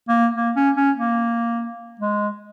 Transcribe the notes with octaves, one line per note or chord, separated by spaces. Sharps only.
A#3
A#3
C#4
C#4
A#3
G#3